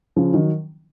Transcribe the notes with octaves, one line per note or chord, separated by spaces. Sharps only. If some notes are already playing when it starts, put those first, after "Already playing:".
C#3 F3
D#3 F#3